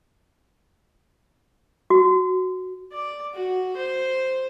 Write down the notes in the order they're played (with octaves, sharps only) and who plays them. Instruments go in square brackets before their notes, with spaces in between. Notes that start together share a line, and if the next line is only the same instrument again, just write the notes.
[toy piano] F#4
[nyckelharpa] D5
F#4
C5